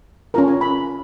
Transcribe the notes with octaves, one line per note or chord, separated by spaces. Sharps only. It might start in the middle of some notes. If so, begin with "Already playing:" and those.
C#4 F4 A#4 A#5
G#5
B5